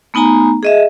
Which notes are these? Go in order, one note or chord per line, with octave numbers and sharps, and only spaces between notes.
A3 B3 D#4 G#5 A#5
G#4 D#5 E5